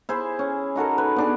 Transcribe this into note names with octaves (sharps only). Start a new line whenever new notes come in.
E4 G#4 C5
C#4
D#4 F#4 A4 A#4
B4
B3 D4 G#4